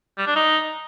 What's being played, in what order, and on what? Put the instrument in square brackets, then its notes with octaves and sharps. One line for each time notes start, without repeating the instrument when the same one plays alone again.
[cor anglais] G3
D4
D#4